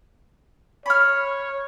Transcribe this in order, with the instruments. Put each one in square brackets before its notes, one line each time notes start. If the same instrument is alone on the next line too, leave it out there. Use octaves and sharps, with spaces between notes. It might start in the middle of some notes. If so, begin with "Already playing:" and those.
[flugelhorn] C#5 [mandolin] B5 F6